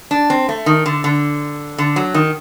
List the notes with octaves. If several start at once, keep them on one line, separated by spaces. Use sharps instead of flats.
D4
C4
A3
D#3
D3
D3
D3
F#3
D#3